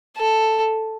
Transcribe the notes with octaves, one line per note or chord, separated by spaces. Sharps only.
A4